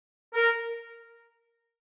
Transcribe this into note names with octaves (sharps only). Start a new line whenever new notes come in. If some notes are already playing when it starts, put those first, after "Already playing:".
A#4